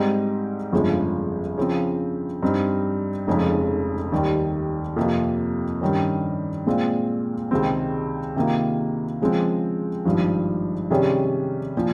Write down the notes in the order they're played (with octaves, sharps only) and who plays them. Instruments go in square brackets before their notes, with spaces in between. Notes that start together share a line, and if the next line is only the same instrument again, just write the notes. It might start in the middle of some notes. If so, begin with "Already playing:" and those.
Already playing: [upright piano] G#2 G3 C4 D#4
G1 F2 C#3 F3 G#3
C#3 F3 C4
G2 G3 C4 D#4
F1 F2 C#3 G#3 D#4
D#2 D#3 G3
F2 C3 F3 A#3
G2 D#3 G3 C#4
A#2 G#3 C4 F4
C#2 C3 D#3 G#3 C4
C3 D#3 A#3 F4
C#3 F3 G#3 C4
G#1 G2 F3
C3 D#3 G3 C#4 G#4
A#2 F3